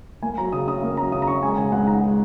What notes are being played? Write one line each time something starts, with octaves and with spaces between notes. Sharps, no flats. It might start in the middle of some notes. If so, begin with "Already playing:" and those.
A#3 G#5
F#3 A#5
C#3 D#6
C#4 D#6
A#3
F#3 A#5
C#3 D#6
A#5
C#4 C#6
G#3 G#5
C#3 G#5
C#2 F#5
D#4 A#5
G#3